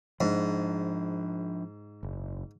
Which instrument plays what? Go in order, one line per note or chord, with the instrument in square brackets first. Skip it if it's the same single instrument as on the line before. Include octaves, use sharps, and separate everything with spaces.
[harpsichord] G#2 [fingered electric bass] F3 C4 D4
[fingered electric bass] F#1